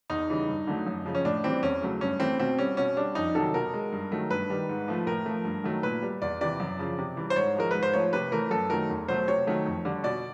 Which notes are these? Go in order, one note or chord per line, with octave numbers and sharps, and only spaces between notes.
E2 D#4
C#3 E3 G3
G2
D3 F#3 A3
F#2
C#3 F3
C#4
A2 D4
E3 G3 C4
E2 C#4
C#3 F#3 A3
G2 C#4
E3 A3 C4
B2 C4
G3 C#4
B2 C#4
G3 D4
F2 D#4
C3 D#3 F#3 A4
B2 A#4
G#3
G2
D#3 F#3 A3
G2 B4
D#3 G3
G#2
F3 A3
A2 A#4
F3 A3
G2
D#3 F#3 A3
A#2 B4
G3
E2 D5
C3 E3 D5
F#2
C#3 F3
C3
E3 G3
C5
G#2 C#5
F3 G#3 A#4
G#2 B4
C5
F3 A3 C#5
C3 B4
E3 A3 A#4
F#2 A4
D#3 F#3 A3 A#4
E2
B2 F#3 A3 C5
C3 C#5
D#3 F#3 A3
F2
D3 G3
B2 D5